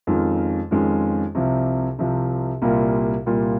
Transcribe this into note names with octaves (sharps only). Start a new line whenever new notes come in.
F2 D#3 G#3 C#4 F4
F2 D#3 G#3 C#4 F4
C2 C3 F3
C2 C3 F3
C2 A#2 G3 A#3 F4
C2 A#2 G3 A#3 F4